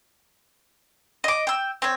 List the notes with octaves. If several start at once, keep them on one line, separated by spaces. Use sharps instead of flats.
D#5 D6
G5 E6
C4 C#5